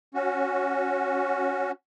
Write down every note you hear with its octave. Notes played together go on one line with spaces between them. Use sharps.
C#4 F#4